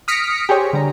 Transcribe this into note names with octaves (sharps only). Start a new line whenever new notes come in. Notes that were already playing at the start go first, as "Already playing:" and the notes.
D#6 F6 A#6 B6 C#7 D7
G4 G#4 C5 C#5
D3 G3 A#5